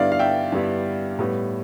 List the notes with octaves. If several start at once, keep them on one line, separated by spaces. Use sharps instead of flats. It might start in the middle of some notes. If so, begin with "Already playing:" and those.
Already playing: G2 D3 G3 B3 E4 D5 F5
F5
E5 G5
G2 D3 G3 B3 E4
A2 G3 B3